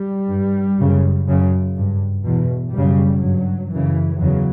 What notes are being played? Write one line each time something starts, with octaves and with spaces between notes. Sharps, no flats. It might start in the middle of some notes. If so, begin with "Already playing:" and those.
Already playing: G3
G2
F#2 C#3
F#2 C#3
G2
E2 B2
F#2 C#3 G3
G2 F#3
F#2 C#3 E3
E2 C#3 F#3